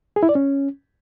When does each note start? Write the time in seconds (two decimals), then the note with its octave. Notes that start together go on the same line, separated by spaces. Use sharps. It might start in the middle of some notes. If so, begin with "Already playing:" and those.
0.16 G#4
0.23 E4
0.29 D5
0.35 C#4